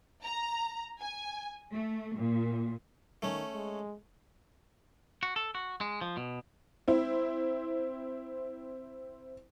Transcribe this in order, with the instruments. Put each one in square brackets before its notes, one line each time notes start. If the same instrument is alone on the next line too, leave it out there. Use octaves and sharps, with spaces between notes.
[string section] A#5
G#5
A3
A#2
[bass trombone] D#3 [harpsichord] A3 C#4
[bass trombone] G#3
[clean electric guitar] F#4
A4
F#4
G#3
F3
B2
[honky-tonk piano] C4 E4